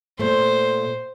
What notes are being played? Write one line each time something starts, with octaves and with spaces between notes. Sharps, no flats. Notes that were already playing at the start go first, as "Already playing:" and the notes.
A#2 A3 C5